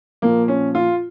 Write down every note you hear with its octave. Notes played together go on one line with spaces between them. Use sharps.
A#2 F3 A#3
C#4
F4